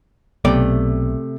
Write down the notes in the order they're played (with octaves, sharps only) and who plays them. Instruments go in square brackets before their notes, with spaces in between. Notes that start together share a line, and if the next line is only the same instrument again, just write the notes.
[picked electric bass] B1 B3 [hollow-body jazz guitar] C3 A3 D5